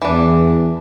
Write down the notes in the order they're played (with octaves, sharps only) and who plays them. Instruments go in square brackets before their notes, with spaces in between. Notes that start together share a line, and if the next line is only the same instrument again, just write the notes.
[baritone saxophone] E2 [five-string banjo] E3 D4